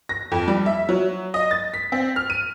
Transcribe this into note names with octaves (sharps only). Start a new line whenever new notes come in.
A#6
F2
G3
E5
F#3
D#5
A6
B6
C4
F6
D#7